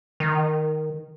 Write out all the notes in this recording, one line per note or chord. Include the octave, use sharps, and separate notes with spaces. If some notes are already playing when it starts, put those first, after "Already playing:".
D#3